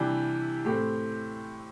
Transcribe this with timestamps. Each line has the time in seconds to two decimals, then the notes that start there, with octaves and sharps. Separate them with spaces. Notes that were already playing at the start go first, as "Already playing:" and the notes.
Already playing: C3 E3 G3 D4 G4
0.65 A2 A3 C4 G4